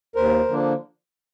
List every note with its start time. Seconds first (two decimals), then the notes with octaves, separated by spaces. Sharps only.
0.15 D#2 A#4 C5
0.48 D3 F3 A#3 D4